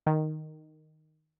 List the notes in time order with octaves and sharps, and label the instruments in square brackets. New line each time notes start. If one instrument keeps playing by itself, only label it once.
[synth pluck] D#3